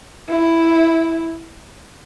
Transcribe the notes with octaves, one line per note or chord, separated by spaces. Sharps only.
E4